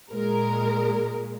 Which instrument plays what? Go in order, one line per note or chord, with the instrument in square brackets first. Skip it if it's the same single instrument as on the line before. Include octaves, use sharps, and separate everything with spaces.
[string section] A#2 G#3 A#4